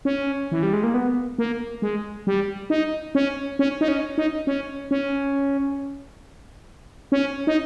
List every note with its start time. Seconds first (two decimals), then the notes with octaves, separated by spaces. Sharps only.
0.05 C#4
0.51 E3
0.63 G3
0.73 G#3
0.83 A#3
0.94 B3
1.38 A#3
1.82 G#3
2.27 G3
2.70 D#4
3.15 C#4
3.59 C#4
3.81 D#4
3.88 C#4
4.18 D#4
4.47 C#4
4.91 C#4
7.12 C#4
7.47 D#4